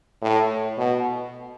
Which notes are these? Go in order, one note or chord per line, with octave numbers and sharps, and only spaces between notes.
A2
B2